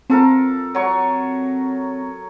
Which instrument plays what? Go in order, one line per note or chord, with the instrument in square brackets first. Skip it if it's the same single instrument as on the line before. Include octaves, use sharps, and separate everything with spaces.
[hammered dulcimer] F3 A4 A#4 [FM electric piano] C4
[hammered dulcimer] F#3 C#5 C#6